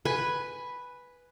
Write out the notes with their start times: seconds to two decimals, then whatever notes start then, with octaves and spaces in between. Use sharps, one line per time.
0.05 B4 G#5